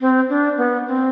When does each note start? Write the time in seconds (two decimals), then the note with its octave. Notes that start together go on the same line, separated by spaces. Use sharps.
0.01 C4
0.29 D4
0.57 B3
0.87 C4